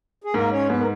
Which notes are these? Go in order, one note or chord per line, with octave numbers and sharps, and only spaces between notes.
G#4
G#2 A#3 A#4
C#4 C#5
G#2 B3 B4
A#4